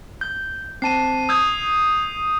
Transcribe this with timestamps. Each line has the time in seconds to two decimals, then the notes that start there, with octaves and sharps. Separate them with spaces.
0.21 G6
0.82 C4 A5 C7 D#7
1.29 D#6 E6 G6 G#6